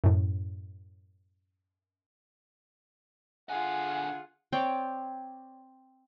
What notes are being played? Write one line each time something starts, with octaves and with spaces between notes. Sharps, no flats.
F#2 A2
D3 F4 G#4 F#5 G#5
C4 C#5 D5 G5